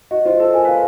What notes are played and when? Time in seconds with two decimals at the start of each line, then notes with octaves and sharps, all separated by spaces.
0.11 F#4 D#5
0.25 F4 C5
0.40 A4 C5
0.54 A#4 G#5
0.65 B4 F5